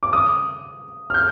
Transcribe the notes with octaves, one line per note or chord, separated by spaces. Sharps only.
D6
D#6
F6
G6